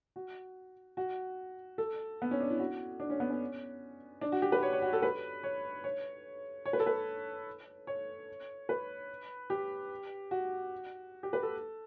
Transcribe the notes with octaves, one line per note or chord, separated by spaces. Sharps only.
F#4
F#4
A4
B3
C#4
D4
E4
F#4
D4
C#4
B3
C#4
D4
F#4
G4
B4
C#5
C#5
F#4
A4
B4
C#5
C#5
C#5
B4
A4
B4
C#5
B4
G4
F#4
G4
B4
A4